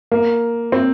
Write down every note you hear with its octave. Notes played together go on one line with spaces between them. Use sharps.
A#3
C4